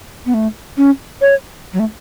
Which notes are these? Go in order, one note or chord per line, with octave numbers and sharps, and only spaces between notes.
B3
A3
C#4
C#5
F#3
A3